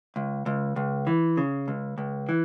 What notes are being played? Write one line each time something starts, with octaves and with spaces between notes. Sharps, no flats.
C#2
C#2
C#2
E3
C#3
C#2
C#2
E3